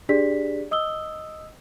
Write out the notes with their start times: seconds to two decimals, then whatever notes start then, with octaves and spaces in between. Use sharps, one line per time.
0.09 D4 G4 G#4 D5 B6
0.71 D#5 D#6 E6 G7